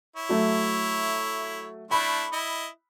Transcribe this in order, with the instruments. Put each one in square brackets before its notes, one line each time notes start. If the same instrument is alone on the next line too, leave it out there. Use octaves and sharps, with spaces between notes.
[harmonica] E4 C#5
[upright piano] F#3 A3
[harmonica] A3 D4 E4 [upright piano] B5
[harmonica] E4 D#5